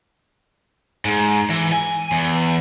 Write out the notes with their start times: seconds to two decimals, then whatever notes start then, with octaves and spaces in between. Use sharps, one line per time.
1.05 G#2
1.50 E3
1.72 G#5
2.12 E2